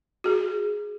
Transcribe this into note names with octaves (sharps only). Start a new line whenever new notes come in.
F#4 G#4